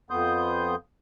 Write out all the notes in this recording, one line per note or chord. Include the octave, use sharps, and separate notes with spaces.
F2 B3 C6 D#6 G6